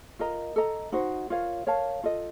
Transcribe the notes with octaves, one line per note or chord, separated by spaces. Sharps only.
F4 A#4 D#5 A#5
A4 D#5 A#5
D#4 F#4 C5
F4 A#4 C#5 F5
A#4 C#5 F5 A5
F4 A4 D#5